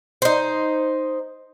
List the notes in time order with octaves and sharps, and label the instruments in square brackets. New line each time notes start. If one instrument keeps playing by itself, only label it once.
[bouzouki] D#4 C5